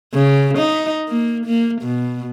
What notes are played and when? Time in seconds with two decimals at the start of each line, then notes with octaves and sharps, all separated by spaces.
0.13 C#3
0.58 D#4
1.08 A#3
1.46 A#3
1.82 B2